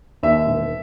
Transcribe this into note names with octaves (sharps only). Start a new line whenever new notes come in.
D#2 E5
E1